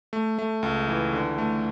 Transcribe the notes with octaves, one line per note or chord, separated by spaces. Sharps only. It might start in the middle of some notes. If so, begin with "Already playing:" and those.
A3
A3
C#2
E3
D3
A3